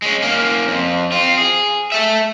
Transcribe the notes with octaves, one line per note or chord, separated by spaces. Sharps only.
G#3 C#4
A#3 C#4
F2
C4 F4
G#4
A4 E5